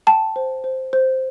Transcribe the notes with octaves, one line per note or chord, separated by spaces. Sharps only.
G5 A5
C5
C5
C5